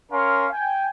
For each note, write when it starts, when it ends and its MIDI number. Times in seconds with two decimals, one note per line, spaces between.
0.11 0.46 61
0.11 0.46 70
0.11 0.46 77
0.11 0.46 84
0.52 0.87 79
0.52 0.87 80